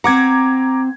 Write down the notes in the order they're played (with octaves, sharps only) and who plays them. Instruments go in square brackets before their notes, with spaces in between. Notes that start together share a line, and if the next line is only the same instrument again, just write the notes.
[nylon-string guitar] C4 F#5 [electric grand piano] A#5 D6 G#6